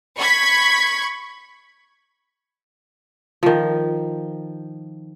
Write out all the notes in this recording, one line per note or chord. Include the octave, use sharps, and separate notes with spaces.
B5 C#6 G#6 B6
D#3 F3